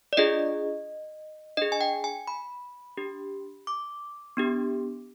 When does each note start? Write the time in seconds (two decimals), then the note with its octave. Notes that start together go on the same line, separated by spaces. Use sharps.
0.13 D5
0.17 D4 F4 G#4 D#5
1.57 D4 G#4 D#5
1.72 G#5
1.81 G5
2.04 G#5
2.28 B5
2.97 D4 G4
3.67 D6
4.37 B3 D4 G4